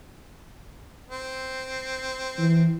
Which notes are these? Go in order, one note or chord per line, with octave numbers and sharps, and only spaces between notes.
C4
E3